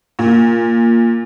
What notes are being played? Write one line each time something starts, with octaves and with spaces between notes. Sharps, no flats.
A#2